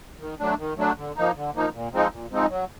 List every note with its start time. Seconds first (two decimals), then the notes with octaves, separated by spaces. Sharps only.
0.19 D#3
0.39 F#3 A3 D4
0.58 D#3
0.77 F#3 A3 D4
0.97 D3
1.16 F3 A#3 D#4
1.35 D3
1.54 F3 A#3 D#4
1.73 A#2
1.93 F3 G#3 C4 D#4
2.11 A#2
2.31 F3 G#3 C4 D#4
2.49 F#3